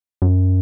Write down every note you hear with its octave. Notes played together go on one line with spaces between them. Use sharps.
F#2